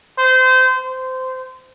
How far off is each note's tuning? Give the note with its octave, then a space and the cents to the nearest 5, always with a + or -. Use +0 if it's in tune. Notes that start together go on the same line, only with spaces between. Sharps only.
C5 -25
C5 -20